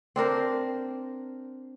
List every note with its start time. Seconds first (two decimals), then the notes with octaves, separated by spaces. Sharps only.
0.16 C4 D4 A#4 C5